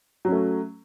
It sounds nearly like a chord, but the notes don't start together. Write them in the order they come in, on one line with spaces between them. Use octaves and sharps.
F#3 C#4 A3